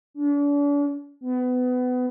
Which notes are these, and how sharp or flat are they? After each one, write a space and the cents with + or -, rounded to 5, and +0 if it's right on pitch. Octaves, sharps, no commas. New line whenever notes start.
D4 -40
B3 +25